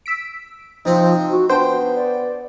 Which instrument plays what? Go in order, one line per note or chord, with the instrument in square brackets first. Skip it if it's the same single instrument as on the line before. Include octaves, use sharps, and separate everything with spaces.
[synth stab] E6 B6 D7
[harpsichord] C3 C4 [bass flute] F3 [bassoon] D#4
[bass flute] F#4
[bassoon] B3 [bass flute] D4 [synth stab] C5 [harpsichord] G5
[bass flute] D5